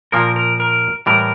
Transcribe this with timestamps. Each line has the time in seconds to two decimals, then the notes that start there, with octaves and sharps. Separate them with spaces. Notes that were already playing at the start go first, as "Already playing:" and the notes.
0.12 A#2 F3 A#3 A#4
0.36 A#4
0.60 A#4
1.06 A2 E3 G3 A#4